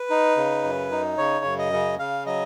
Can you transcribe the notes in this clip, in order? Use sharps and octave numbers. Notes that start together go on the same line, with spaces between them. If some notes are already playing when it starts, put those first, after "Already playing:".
Already playing: B4
D#4
C#3
F#2
D#4
C#3 C#5
F#2
D#5
C#3
C#3 F5
F#3 D#5